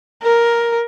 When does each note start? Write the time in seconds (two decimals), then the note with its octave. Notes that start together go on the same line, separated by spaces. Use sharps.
0.23 A#4